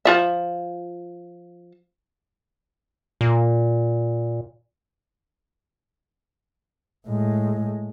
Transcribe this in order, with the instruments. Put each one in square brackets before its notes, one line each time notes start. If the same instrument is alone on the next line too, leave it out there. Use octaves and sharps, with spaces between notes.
[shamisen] F3 F4 E5
[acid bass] A#2
[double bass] A2 G#3